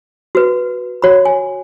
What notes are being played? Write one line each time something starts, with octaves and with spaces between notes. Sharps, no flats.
F#4 B4
F#4 C#5 B5
G#5